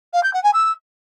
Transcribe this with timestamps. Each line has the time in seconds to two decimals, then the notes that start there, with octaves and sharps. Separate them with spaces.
0.13 F5
0.24 G6
0.34 F#5
0.44 G#5
0.54 E6